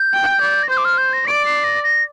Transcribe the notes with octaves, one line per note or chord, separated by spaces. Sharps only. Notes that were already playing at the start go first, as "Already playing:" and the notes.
Already playing: G6
G5
D5
A#6
C5 G6
D6
F6
G6
A#6
D5 D7
C7
A#6
A#6